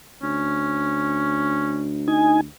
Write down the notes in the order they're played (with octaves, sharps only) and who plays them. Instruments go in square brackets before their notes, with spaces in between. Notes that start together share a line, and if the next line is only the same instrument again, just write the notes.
[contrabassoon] D2 [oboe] C#4
[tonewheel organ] D#4 G#5